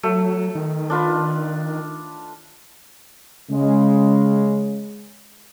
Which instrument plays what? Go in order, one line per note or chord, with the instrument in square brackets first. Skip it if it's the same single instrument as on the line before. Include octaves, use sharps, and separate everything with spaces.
[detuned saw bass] F#3 [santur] A3
[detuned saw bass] D#3
[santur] D4 F4 B4
[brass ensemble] C#3 G#3